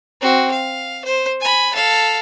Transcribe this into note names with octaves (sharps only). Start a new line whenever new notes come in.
C4 F#4
F5
C5
G#5 B5
A4 F5